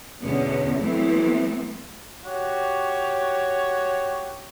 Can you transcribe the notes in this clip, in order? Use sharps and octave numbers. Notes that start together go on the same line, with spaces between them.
E2 B2 D3 B3 C#4
E3 F#3 A3 B3 C4 E4
F#4 G4 C#5